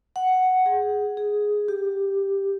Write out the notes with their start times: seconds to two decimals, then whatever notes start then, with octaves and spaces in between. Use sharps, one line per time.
0.16 F#5
0.66 G#4
1.17 G#4
1.68 G4